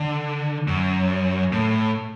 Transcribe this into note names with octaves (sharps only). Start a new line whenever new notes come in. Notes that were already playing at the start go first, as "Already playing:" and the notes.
Already playing: D3
F#2
A2